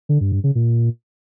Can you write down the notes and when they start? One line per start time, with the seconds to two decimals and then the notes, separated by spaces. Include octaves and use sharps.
0.09 D3
0.21 G2
0.32 G2
0.44 C#3
0.55 A#2